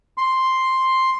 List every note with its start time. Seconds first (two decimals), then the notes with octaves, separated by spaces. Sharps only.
0.18 C6